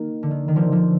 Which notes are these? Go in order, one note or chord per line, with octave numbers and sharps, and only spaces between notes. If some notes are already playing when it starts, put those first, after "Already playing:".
Already playing: D#3 A#3
D3
D#3
D#3
D3 F3
D3 F3